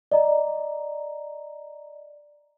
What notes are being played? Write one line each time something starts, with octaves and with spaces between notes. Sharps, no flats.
D5 D#5 A#5